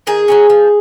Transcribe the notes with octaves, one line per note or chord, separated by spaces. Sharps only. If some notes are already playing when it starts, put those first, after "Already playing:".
D#3 G#4
F#3 A#3 C#4
F3